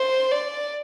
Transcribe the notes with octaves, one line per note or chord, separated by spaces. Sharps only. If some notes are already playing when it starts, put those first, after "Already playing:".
Already playing: C5
D5